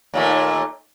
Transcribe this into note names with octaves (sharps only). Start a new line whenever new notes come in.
D#2 A#2 A3